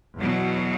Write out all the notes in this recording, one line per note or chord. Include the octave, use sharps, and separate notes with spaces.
E2 B2 F#3